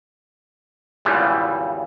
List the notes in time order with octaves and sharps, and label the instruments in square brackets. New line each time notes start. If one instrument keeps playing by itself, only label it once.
[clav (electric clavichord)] G#1 E2 C#3 E3 F3 G3